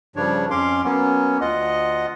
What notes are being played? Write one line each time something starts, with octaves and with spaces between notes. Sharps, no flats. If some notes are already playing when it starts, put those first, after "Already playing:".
G2 C#3 F3 D4 C#5
F2 C#4 F5 C6 D6
F#3 A#3 B3 C#4
D2 F4 D#5 F#5